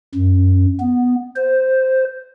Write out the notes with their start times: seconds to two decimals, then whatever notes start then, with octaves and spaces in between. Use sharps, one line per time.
0.15 F#2
0.80 B3
1.36 C5